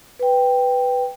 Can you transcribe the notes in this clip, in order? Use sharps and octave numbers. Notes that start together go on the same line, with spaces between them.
B4 G5